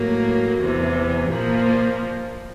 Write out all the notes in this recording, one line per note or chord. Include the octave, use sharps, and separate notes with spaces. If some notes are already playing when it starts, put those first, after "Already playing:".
Already playing: A2 F#3 A#3
E2 C3 E3
A#2 F3 A#3